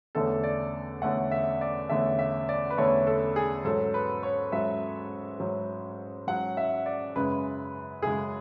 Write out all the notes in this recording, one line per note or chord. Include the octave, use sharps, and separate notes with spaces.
E2 D3 A3 C#4 A4
D5
E2 D3 A3 C#4 F#5
E5
D5
E2 D3 A3 C#4 E5
E5
D5
B4
E2 D3 A3 C#4 C#5
A4
G#4
G#2 F#3 C#4 A4
B4
C#5
G#2 F#3 C#4 E5
G#2 F#3 C#4
G#2 F#3 C#4 F#5
E5
D5
F#2 C#3 G#3 B4
F#2 C#3 G#3 G#4